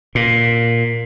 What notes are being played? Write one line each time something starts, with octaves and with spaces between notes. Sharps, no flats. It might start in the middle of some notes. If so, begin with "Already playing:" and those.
A#2